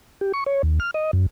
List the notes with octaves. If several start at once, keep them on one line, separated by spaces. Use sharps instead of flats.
G4
C#6
C#5
D#2
F6
D#5
F#2